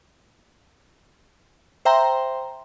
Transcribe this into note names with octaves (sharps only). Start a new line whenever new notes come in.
C5 E5 G5 A#5 C6